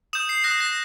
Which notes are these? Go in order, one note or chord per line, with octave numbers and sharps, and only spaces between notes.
D#6 G6 E7
C7
D#6 F#6 A#6
A#6